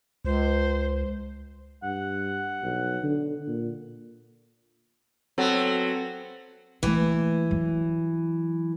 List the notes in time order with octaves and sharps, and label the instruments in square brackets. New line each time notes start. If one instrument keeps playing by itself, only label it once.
[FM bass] C#2 [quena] C5
[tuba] G2 [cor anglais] F#5
[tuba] B1
D3
A#2
[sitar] F#3 B3 [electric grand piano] C4 A4
[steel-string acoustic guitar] E3 [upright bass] A3 A#3
[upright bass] F#3